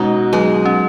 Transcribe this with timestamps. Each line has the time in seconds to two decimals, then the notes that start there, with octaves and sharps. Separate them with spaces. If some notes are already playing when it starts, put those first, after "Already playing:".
Already playing: B2 G#3 B3 C#4 D#4
0.33 F#3 G#3
0.65 C#4